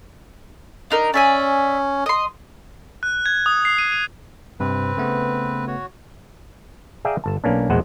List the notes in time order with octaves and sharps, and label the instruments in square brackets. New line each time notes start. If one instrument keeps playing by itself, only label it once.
[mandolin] D4 D#4 A#4
[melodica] C#4 [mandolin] D5 E5 G#5
[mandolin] D#5 C6
[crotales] F#6
G#6
D#6
C7
D#7
D#7
[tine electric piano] G2 C3 [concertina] C4 B4
[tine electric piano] C#3 A3 B3
[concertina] F#4 C#5
[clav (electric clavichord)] G#4 D5 E5 F5 G5 A#5
G1 A5
B1 A#3 C#4 D4
A#1 E2 B2 G#3 C5 F#5